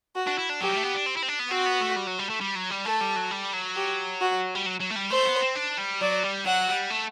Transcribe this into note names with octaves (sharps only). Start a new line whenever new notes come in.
F#4
D4
E4
D4
F#3 G4
G3
A3
B3
D4
C4
E4
C4
D4
B3
C4 F#4
B3
A3
G3
F#3
G3
A3
G3
F#3
G3
A3 A4
G3
F#3
G3
F#3
G4
F#4
G3
F#3
F#3
A3
G3
A3 C5
B3
C4
D4
G3
F#3 D5
G3
F#3 F#5
G3
A3